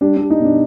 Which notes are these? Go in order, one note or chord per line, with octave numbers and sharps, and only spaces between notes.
G3 D4
G3 D4
D#4
B2 D4